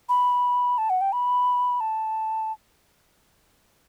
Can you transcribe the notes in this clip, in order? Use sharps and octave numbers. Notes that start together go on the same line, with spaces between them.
B5
A5
F#5
G5
B5
A5